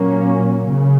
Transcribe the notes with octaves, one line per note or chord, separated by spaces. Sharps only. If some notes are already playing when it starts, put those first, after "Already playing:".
Already playing: A#2 F#3 A#3 C#4
C#3